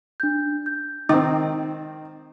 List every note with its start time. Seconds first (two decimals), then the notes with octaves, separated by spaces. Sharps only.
0.20 D4 G6
0.66 G6
1.09 D#3 C4 D#4